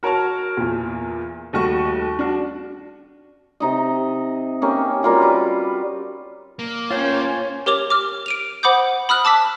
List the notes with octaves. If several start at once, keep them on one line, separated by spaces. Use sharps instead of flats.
F#4 A#4 C#5 A5 F6
E2 A#2
D#2 G3 A3 F#4 C#6
D4 F#4
C3 D#4 D#5
A#3 C#4 G4 C#5
G3 A#3 F4 F#4
B4 D6
A#3
C#4 F4 C5 C#5 G5
G4 A#4 C#5 D6 F7
D6 F6
D7 D#7 F7
C5 F#5 B5 D6 D#6 G6
B5 D#6 F6 F#6
A5 D6 E6 B6